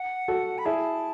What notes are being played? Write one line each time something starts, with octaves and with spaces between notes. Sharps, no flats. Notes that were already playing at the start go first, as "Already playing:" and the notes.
Already playing: F#5
F#4 A4
B5
E4 G#4 A5